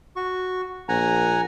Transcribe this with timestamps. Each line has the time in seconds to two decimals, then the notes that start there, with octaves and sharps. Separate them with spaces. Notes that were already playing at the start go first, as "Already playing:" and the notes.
0.16 F#4 C#6
0.89 A#1 F#5 G#5 A#5